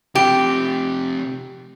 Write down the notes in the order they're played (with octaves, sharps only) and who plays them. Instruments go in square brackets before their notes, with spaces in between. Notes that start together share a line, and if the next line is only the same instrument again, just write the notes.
[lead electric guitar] C3 F3 [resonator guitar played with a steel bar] G4